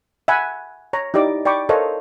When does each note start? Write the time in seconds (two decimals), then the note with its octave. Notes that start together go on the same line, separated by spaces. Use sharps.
0.28 E5 F#5 G#5 B5
0.93 C#5 A#5
1.14 D#4 E4 G4 D5 D6
1.45 D5 G5 B5 C#6 D6
1.69 A4 A#4 C5 C#5 D#5 F5